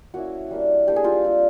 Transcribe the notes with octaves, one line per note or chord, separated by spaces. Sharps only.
A#3 C#4 E4 F#4
G3 A#3 D4
G3 A#3 D4 G4
G#4
F4 G4
G3 C4 F4